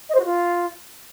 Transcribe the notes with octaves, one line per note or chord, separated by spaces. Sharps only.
D#5
C5
F#4
F4